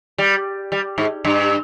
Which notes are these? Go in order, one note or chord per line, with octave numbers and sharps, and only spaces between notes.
G3
G3
G#2
G2